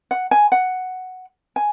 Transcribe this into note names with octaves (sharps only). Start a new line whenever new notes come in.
F#5
G#5
F#5
G#5